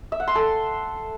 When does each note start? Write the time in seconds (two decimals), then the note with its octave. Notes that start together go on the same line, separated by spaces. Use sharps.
0.12 E5
0.20 F#5
0.28 C6
0.35 A4